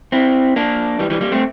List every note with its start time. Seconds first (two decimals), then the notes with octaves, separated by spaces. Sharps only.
0.12 C4 E4
0.56 A#3 D4
0.99 E3 G3
1.10 E3 G3
1.21 G3 A#3
1.32 A3 C4